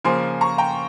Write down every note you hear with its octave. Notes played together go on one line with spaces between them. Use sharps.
C#3 F3 A#3 G#5 C6
A#5 C#6
G5 A#5